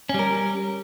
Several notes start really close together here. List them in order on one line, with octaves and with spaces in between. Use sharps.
C#4 G3 A#4